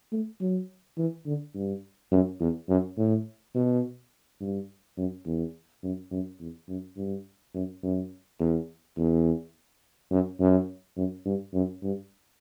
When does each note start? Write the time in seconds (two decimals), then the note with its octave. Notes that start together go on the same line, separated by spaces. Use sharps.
0.12 A3
0.41 F#3
0.98 E3
1.26 D3
1.55 G2
2.12 F#2
2.40 E2
2.69 F#2
2.98 A2
3.55 B2
4.41 G2
4.97 F#2
5.26 E2
5.83 F#2
6.11 F#2
6.40 E2
6.68 F#2
6.97 G2
7.54 F#2
7.83 F#2
8.40 E2
8.97 E2
10.11 F#2
10.40 F#2
10.97 F#2
11.25 G2
11.54 F#2
11.83 G2